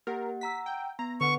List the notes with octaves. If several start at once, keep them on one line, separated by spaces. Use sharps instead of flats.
A#3 G4 A#4 F#5
F#5 A#5 E6 B6
G5
B3 A#5
D3 B4 F#5 C#6